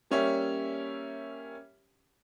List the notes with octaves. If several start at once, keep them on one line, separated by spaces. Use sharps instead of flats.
G3 A#3 C#4 G4 C#5 E5